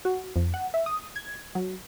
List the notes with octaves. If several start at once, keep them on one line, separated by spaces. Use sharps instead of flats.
F#4
F2
F#5
E5
D#6
G#6
F#3